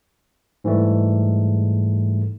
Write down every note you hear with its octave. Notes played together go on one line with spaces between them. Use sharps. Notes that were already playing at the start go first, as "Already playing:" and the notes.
G#2 E3 G3 A3